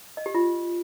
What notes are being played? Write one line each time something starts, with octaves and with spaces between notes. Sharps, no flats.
D#5
G4
F4